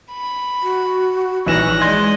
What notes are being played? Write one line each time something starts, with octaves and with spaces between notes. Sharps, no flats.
B5
F#4
A#1 E3 D#4 C#5 F#6 A#6 E7
G#3 D5 D#5 C6 G#6